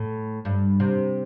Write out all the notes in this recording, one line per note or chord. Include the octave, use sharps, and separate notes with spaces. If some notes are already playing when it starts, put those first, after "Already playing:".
Already playing: A2
G2
C3